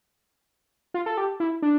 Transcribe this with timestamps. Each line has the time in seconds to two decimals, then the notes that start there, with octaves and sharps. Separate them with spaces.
0.94 F4
1.06 A4
1.18 G4
1.40 E4
1.62 D4